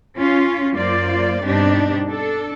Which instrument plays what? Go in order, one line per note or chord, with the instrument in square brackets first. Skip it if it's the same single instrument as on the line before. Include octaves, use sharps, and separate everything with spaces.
[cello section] C#4 F4
F#2 A#3 F4 C5 D5
G2 B2 C4 D4 D#4 G4
D4 A4